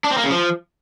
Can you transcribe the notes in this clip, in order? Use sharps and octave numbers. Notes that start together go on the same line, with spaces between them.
D4
C4
A#3
C#3
F3